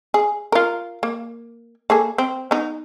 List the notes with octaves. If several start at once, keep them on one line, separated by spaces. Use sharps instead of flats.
G#4
F4 A#4
A#3
A#3 G#4 A4
C4
B3 D#4